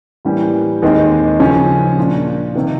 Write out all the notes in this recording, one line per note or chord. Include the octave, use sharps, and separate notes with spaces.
A2 E3 G3 A#3 C#4
D#2 D#3 G#3 C4 D#4
C#3 F3 G#3 C#4
A#2 F3 A#3 D4 F4
C3 D#3